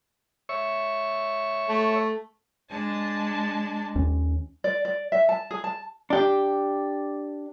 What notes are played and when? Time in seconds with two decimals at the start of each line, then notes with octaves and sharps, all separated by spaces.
0.49 C#5 E5 C#6
1.69 A3
2.70 G#3 D4 A5
3.96 D#2 C#4
4.64 D5
4.85 D5
5.12 E5
5.29 A5
5.51 G#4
5.64 A5
6.10 D4 G4